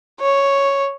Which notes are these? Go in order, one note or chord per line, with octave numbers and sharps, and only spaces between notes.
C#5